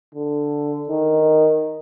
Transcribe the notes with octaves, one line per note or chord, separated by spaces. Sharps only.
D3
D#3